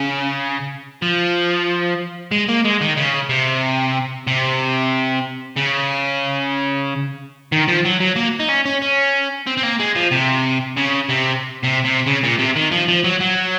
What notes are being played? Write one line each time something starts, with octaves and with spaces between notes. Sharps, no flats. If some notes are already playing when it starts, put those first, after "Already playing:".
Already playing: C#3
F3
G#3
A#3
G#3
D#3
C#3
C3
C3
C#3
D#3
F3
F#3
F#3
A#3
D#4
C#4
C#4
C#4
C4
C4
A#3
G#3
F3
C3
C#3
C3
C3
C3
C#3
A#2
C3
D#3
F3
F3
F#3
F#3